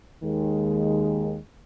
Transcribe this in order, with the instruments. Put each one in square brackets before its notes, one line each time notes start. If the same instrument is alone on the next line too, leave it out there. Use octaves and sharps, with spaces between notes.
[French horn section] D#2 D#3 G#3